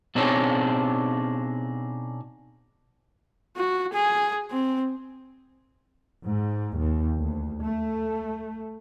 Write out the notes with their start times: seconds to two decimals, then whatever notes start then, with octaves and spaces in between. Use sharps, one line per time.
0.15 B2 C4 D4 D#4 G#4 C#5
3.57 F#4
3.93 G#4
4.51 C4
6.27 G#2
6.81 D#2
7.19 D2
7.62 A3